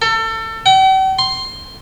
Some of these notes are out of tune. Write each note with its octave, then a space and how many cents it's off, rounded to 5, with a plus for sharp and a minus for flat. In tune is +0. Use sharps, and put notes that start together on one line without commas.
A4 +30
G5 -45
C6 +10